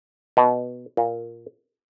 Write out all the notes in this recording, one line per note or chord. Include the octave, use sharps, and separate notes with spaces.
B2
A#2